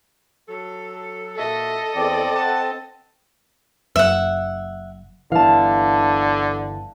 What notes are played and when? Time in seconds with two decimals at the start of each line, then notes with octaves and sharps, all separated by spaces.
0.49 F#3 A4
1.36 A#2 F#4 A4 D#5 E5
1.95 E2 C4 D5
2.35 F#5 A5
3.96 F#1 F#2 E5 F#5
5.32 G1 D3 E3 F5 A5